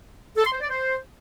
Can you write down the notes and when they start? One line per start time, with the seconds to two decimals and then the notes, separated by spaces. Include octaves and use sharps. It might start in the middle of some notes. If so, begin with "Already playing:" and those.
0.37 A4
0.45 C6
0.53 C5
0.61 D5
0.69 C5